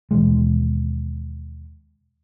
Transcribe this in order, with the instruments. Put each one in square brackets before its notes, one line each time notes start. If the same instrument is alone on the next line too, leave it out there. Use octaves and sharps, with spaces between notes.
[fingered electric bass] D#2 B2 E3 G#3